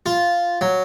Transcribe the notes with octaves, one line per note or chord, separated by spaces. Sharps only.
F4
F#3